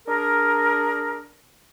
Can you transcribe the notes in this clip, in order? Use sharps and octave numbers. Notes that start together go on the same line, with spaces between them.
D4 G#4 A#4